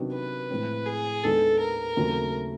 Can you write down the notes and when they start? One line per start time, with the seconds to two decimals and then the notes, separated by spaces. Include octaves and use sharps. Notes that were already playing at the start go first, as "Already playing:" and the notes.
Already playing: C3 D#3 F#3 B3 D4
0.13 B4
0.50 A2 F3 G#3 C4
0.86 G#4
1.24 D#2 D#3 G#3 B3 D4 A4
1.60 A#4
1.97 D#2 C#3 F#3 A3 C4